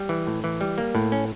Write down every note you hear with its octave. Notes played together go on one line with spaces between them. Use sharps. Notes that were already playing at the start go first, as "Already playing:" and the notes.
Already playing: G3
E3
A2
E3
G3
A#3
A2
C#4